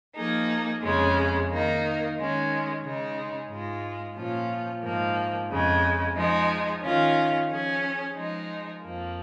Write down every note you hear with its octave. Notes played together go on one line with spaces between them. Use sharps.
F3 A#3 D#4 G#4
F2 C#3 G#3 C#4
D#3 A#3 D#4
D#3 G#3 C#4
C#3 G#3 D#4
G#2 G#3 F4
A#2 F3 C#4 F4
G#2 F3 A#3
F2 C#3 G#3
F3 G#3 D#4
D#3 C#4 F4
F3 C#4 G#4
F3 G#3 D#4
F2 F3 A#3